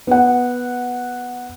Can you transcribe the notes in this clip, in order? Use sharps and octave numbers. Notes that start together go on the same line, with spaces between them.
B3 F#5